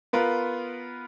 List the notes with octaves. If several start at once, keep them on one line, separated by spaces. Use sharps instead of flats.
B3 F4 A#4 B4